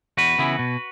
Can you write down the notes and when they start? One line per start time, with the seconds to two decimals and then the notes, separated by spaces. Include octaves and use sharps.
0.17 E2 F#4 B4
0.39 C#3 E3 B3 E4
0.59 B2